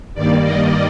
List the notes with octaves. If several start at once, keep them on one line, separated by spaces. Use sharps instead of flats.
G2 D#3 G3 A#3 D5
D#5